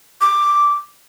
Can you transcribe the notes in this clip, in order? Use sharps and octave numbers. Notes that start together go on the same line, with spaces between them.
D6